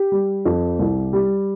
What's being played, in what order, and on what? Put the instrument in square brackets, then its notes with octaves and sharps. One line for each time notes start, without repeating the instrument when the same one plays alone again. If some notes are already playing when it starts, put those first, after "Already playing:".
Already playing: [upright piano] G4
G3
F2
C2
G3